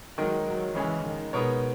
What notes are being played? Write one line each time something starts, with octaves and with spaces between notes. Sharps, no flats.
D#3 F#3 G#3 D#4 A#4
F#3
C#3 E3 G#3 C#4 G#4
D#3
B2 G#3 B3 D#4 A#4 C#5